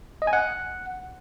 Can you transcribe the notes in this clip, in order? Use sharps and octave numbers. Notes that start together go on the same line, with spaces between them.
D#5
G#5
F#5